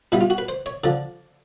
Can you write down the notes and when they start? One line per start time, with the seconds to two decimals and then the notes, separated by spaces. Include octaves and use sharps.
0.12 A#2 G3 B3 E4
0.21 F4
0.30 F#4
0.38 B4
0.48 C5
0.66 C#5
0.84 D3 F3 D5